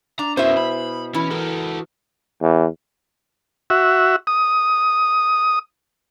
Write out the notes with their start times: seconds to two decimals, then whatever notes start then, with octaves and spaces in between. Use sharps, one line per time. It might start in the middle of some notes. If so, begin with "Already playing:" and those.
0.19 D4 A#5
0.37 B2 C#4 E4 A#4 C5 E5 G#5
0.57 B5
1.15 E3 C#4 E4
1.31 F#4 A4 A#4
2.41 E2
3.70 F#4 E5
4.27 D#6